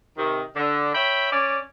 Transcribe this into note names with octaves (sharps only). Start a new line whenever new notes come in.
C3 D#3
D3
C#5 E5 G5 B5
C#4 D5